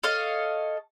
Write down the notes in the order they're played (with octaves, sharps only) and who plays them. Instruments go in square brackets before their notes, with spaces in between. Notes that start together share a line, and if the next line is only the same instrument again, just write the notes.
[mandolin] A4 C#5 D#5 F5